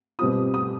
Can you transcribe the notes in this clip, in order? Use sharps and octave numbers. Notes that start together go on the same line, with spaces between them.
B2 G3 C4 F4 D#6
D#6